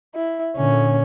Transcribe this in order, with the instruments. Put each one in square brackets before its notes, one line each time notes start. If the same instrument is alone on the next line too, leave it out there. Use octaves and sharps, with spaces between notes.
[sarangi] E4
[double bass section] A#2 D3 [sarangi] C#4